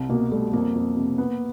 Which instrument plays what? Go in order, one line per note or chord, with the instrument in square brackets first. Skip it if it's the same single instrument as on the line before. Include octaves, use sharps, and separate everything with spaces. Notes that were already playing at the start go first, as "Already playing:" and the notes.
Already playing: [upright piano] C2
[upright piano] B2 [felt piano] A#3
[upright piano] G3 [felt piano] A3
[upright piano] F2 [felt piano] A#3
[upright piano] F2
C3
B3